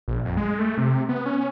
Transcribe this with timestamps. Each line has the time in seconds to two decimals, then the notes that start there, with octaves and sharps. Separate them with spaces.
0.08 A#1
0.25 F2
0.37 G#3
0.59 A3
0.78 C3
1.09 B3
1.26 C#4